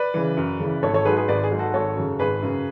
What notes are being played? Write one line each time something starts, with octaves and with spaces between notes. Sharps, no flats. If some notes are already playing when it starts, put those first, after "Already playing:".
Already playing: B4 D5
C#3 E3
F#2
C#3 E3
G#1 A4 C#5
A4 C#5
G#2 F#3 G#4 B4
G#4 B4
G#1 B4 D5
G#4
G#2 F#3
F#4 A4
G#1 A4 C#5
F#2 C#3
G#1 G#4 B4
F#2 C#3